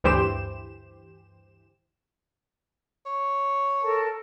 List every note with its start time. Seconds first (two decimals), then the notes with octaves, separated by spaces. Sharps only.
0.04 D2 G2 E3 G4 C5 E7
3.06 C#5
3.82 A4 A#4 A5